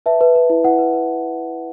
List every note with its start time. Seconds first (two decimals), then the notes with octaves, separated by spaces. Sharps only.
0.06 B4 E5 A5
0.21 B4
0.35 B4
0.50 E4
0.64 E4 F#5
0.79 B4
0.93 B4